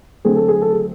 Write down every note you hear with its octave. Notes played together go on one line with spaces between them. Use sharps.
D3 F#3 A3 C4 G#4
A4
G#4
A4
G#4